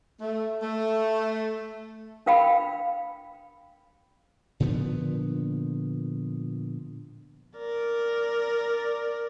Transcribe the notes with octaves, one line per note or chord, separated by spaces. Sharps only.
A3
A3
D4 A#4 F5 G5 B5
A#2 D3 F3 B3
A#4 D5